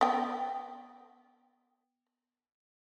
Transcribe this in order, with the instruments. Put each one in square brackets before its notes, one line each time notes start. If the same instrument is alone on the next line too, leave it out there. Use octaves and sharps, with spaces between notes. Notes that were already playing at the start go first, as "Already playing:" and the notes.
[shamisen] B3 G5